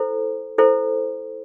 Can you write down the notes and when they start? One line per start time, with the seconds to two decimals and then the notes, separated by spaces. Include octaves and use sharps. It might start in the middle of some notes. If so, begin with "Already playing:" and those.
Already playing: E4 A4 C5
0.58 E4 A4 C5